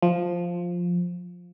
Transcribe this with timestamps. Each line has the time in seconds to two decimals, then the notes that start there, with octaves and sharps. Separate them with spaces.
0.02 F3